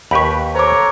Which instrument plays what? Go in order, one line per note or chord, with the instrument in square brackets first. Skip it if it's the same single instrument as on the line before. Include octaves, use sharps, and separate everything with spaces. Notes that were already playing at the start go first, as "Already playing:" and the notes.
[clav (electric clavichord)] D#2 G4 B4 [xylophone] B5 C#6
[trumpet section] A4 C#5 A#5 [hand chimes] C5 D6